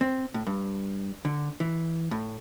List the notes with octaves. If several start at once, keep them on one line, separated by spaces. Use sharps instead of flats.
C4
A2
G2
D3
E3
A2